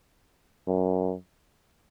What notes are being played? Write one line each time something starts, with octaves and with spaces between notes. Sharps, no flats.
F#2